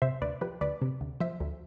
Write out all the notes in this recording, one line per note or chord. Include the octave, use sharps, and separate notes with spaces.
C3 C5 E5
D2 B4 D5
F3 G4 B4
D2 B4 D5
C3
D2
F3 C5 E5
D2